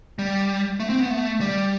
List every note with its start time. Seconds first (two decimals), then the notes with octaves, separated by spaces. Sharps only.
0.19 G3
0.80 A3
0.90 C4
1.00 B3
1.10 A3
1.40 G3